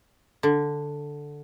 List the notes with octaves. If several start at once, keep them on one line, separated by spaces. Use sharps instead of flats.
D3